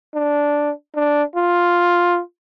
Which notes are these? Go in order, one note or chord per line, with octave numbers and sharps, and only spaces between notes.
D4
D4
F4